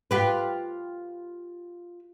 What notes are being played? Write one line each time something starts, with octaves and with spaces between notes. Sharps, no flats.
F4 G4 B4